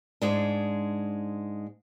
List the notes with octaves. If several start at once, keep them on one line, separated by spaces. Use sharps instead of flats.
G#2 G#3 D4